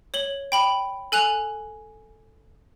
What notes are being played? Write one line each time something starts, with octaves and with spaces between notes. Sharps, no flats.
C#5 F#7 G7
G5 B5 F#7
A4 G#5 F#6 F7